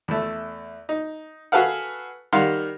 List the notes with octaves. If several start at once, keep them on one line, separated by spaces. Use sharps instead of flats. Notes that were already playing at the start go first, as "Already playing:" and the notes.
E2 A3
D#4
F#4 G#4 A4 B4 F5 F#5
D#3 G3 F5 F#5 C6